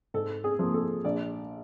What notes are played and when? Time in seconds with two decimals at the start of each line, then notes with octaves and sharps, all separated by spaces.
0.14 G#2 A4
0.44 G#4
0.59 F3 A#3
0.74 A4
1.05 A#1 D5